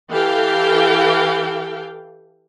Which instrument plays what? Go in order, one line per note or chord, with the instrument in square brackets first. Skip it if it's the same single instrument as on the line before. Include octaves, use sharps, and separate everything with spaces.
[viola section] E3 G4 A4 F5 G5